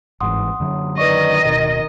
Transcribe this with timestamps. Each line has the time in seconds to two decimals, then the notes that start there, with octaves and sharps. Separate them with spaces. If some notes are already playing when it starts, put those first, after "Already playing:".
0.21 G1 G#2 E3 F#5 C6 D#6
0.60 F#2 D3 F#3
0.98 D#3 B4 D5 D#5 C#6
1.45 D1 B2 A#4